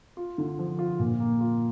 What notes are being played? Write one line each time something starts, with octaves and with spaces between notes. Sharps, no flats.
F4
D3
F3
F4
A#2
A#3
F4